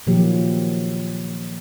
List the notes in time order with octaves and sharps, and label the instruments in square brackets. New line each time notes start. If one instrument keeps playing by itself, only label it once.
[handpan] A#2 D#3 F3 F#3 A#3 G4